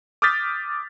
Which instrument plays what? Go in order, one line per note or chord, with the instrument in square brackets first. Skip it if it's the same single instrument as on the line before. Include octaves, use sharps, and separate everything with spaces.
[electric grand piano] D6 D#6 F6 G6 A6 B6